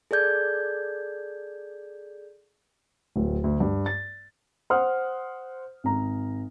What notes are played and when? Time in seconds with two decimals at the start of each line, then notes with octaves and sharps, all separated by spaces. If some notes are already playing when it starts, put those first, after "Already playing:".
0.11 G#4 A4 D5 G6 G#6
3.16 D1
3.44 D2
3.60 G2
3.86 A6
4.70 C5 F#5 D#6 F6
5.84 G#1 A#5